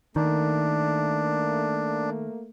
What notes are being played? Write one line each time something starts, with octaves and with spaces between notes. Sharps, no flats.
D#3 A3 A#3 D4